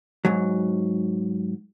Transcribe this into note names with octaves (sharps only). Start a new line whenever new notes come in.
G#2 F#3